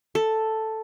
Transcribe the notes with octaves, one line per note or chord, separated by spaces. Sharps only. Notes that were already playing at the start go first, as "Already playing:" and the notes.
A4